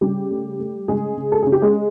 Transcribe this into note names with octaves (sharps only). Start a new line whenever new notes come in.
C#3 G3 G4
A3
A3
C#3 G#3 G#4
C#3
A4
C#3 G#4
G4
G#3 G#4